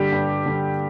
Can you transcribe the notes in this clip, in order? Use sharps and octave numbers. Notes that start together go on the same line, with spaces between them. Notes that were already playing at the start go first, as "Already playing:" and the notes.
Already playing: G2 D3 G3 G4
G2
D3 G3